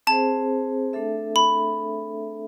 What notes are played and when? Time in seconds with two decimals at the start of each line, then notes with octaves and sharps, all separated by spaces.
0.07 C4 G#4 C5 A5
0.93 A3 D4 A4 E5
1.36 B5